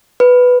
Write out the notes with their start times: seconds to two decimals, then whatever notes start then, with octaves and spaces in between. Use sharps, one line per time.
0.20 B4